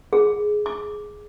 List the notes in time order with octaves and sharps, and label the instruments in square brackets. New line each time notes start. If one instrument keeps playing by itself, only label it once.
[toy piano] G#4
D6